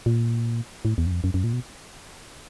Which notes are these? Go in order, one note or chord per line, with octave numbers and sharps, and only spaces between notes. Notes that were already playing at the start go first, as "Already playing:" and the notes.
A#2
A2
E2
F#2
F2
F#2
F#2
A#2
B2